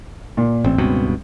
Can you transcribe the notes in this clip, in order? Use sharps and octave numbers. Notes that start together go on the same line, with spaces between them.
A#2
A1 C4
C#2 G2 B2